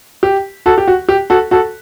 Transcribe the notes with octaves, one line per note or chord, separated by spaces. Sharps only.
G4
F#4 A4
G4
F#4
G4
F#4 A4
F#4 A4